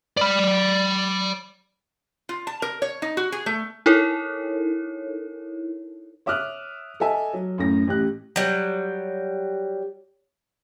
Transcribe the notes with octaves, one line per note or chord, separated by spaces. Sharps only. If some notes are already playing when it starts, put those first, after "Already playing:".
D5 B5
F4
A5
A#4
C#5
D#4
F#4
G#4
A3
D#4 E4 A4 A#4 C#5
C#5 E5 D6 D#6 F6 F#6
A4 D#5 E5 G#5
F#3
F#2 A2 A#6
A1 G4 F#6
F#3 G3